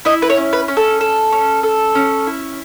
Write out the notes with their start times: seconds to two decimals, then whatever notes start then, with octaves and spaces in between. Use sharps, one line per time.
0.05 E4 D#5
0.22 B4
0.30 C#5
0.37 C#4
0.53 B4
0.68 C#4
0.77 A4
1.01 A4
1.32 C#4
1.63 A4
1.95 C#4
2.27 E4